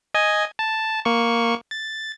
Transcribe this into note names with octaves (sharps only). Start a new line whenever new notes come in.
D#5 G#5 G#6
A5
A#3 C#6
A6